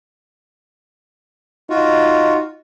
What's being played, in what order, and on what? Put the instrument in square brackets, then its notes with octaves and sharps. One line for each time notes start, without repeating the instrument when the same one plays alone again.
[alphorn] D#4 [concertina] F4 F#4